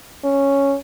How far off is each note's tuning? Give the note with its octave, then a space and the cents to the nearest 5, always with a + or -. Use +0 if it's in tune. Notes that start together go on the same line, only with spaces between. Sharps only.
C#4 +0